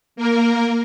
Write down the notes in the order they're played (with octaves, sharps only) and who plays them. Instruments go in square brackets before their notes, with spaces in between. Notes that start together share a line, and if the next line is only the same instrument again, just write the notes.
[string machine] A#3 A#4